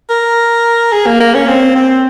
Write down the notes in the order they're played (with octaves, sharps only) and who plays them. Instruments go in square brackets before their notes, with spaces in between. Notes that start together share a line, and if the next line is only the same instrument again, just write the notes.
[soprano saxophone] A#4
G#4
A#3
A#3
C#4
C4
C4